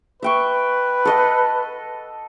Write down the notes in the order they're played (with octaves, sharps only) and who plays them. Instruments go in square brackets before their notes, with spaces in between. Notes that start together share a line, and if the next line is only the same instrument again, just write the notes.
[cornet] B4 [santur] E5 G5 C#6
[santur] A4 D#5 F#5